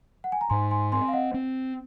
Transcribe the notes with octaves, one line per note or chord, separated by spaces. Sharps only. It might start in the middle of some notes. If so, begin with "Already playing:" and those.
F#5
G#5
A#5
G#2 G#5 C6
G#5 C6
C4 G#5 C6
F5
D#5 F#5
C4